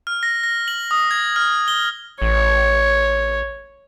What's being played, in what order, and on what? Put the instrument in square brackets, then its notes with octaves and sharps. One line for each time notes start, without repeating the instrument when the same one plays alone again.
[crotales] F6
A#6
A#6
F#7
D#6
G#6
F6
G7
[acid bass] A1 [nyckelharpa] C#5